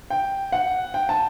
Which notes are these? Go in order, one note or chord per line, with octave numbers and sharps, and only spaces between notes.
G5
F#5
G5
A5